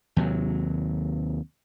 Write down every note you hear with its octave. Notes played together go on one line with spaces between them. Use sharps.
D#2 C3 F#3